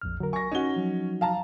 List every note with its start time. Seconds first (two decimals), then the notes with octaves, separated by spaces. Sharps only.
0.02 A#1 F2 F6
0.20 D3 F#3 A#4
0.33 G#5 C#6 A#6
0.52 C#4 D#4 F#4 G7
0.76 F3 F#3
1.21 F5 A5 A#5